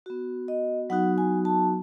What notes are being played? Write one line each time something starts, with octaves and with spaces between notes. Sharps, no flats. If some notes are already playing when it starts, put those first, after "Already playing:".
B3 F#4
D#5
F#3 B3 D#4 F#4 F#5
G#5
A5